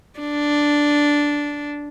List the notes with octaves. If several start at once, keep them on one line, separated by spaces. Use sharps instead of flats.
D4